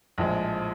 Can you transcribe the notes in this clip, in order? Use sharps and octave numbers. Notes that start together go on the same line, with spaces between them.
A#1 A2 F3 G#3